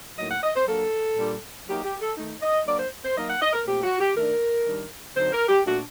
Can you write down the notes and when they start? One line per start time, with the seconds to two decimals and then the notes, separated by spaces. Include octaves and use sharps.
0.18 A2 F#3 A#3 D#4 D#5
0.30 F#5
0.42 D#5
0.55 C5
0.67 F#3 A#3 D4 A4
1.17 A#2 G3 D4
1.68 F#3 A#3 D#4 G4
1.83 G4
2.01 A4
2.17 D#3 A3 D#4
2.41 D#5
2.66 F#3 A#3 D4 D5
2.79 C5
3.04 C5
3.16 F#3 A#3 D#4 D#5
3.28 F#5
3.42 D#5
3.53 A#4
3.66 A#2 A3 C4 G4
3.83 F#4
3.99 G4
4.16 D#3 A3 D4 A#4
4.65 D#3 G3 D4
5.15 D3 F#3 C4 D#4 C5
5.32 A#4
5.48 G4
5.65 A#2 A3 D4 F#4